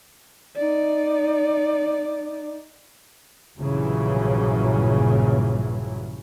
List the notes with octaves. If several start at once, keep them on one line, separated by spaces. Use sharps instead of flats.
D#4 D5
A#1 G2 A#2 C#3 E3 F#3